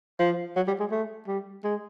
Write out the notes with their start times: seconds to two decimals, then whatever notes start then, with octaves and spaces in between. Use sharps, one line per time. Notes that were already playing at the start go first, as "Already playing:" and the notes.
0.20 F3
0.56 F#3
0.68 G3
0.80 G#3
0.91 A3
1.28 G3
1.64 G#3